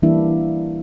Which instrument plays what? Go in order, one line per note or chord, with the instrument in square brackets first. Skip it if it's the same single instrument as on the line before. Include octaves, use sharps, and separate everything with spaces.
[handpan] E3 G3 A#3 D4 E4 E5